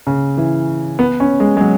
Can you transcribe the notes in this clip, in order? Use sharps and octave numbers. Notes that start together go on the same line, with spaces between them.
C#3
E3
B3
C#4
G#3
G#3
F#3